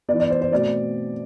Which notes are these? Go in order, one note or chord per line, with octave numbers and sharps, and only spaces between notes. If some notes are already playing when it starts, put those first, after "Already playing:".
E3 B3 D5
D5
C5
C5
B2 A3 C4 D5